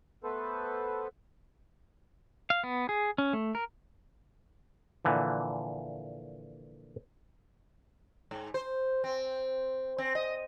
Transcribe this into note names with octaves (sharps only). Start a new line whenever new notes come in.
A3 B3 A4 B4 C5
F5
B3
G#4
C#4
A3
A#4
A#2 D3 E3 F3
G#2
C5
C4
C4
D#5